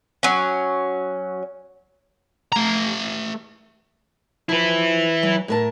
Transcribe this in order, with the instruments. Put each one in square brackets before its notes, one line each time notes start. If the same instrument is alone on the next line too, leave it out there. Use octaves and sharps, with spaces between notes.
[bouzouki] F#3 C#4
[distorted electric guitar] A3 A#5
[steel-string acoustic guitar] F3 [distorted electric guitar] E4 B4
[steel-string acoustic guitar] F#3
A2 A#4 A5